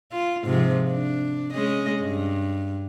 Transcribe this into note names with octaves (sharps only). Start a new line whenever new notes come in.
F4
G#2 C3 F3
D4
G#3 C#4 D#5
G2